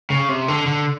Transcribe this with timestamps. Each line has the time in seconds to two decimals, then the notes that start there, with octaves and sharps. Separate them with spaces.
0.10 C#3
0.29 C3
0.48 D3
0.66 D3